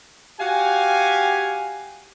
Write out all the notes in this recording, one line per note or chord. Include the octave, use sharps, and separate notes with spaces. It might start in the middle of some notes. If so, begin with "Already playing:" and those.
F#4 G4 F5 G#5